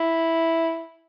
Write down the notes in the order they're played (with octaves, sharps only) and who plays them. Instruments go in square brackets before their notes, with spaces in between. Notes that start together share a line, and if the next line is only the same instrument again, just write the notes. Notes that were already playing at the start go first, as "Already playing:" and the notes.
Already playing: [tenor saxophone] E4